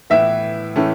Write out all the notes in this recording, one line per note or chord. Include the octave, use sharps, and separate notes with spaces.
A2 E3 B3 E4 E5
A2 E3 A3 C#4